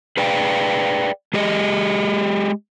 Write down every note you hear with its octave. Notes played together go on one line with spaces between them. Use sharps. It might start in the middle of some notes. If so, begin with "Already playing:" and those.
G#4 B4 D5 F5 G5
G#3 G4 G#4 D#5